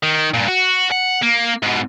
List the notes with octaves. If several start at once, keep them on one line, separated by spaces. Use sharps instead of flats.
D#3
G2 A#2
F#4
F#5
A#3
G#2 B2